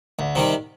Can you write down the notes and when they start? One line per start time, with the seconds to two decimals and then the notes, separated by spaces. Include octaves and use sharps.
0.19 D2
0.35 C3 D#3 G3